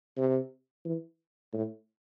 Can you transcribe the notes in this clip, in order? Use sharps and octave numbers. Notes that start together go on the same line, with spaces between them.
C3
E3
A2